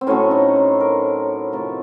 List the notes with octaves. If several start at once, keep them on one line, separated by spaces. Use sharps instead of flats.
C4
A2 F#3 A3 C#4
D#4
C5
A#4
C3 F3 A3